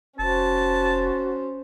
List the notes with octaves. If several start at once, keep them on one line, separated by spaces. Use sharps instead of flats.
F1 C#4 F#4 C5 A5